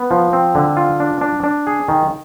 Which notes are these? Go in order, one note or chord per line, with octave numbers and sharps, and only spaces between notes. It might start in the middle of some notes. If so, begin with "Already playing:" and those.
Already playing: B3
F3
C4
D3
F4
D4
D4
D4
G#4
D#3